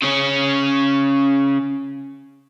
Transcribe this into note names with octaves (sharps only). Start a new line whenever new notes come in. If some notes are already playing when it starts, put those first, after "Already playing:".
C#3 C#4